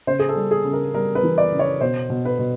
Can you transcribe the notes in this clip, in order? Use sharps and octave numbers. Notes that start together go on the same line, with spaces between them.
C#3 C5
G#4
A4
G3
G#4
C#3
A#4
G3 A#4
B4
E3
D5
C#3
C#5
B2 C5
B2
B4
B2